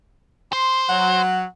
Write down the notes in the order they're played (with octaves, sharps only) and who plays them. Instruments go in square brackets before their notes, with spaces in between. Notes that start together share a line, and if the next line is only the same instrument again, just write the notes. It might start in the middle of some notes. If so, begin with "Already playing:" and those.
[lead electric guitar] C5 [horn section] C6
[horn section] F#3 [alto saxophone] F#5